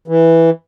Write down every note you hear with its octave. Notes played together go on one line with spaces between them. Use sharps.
E3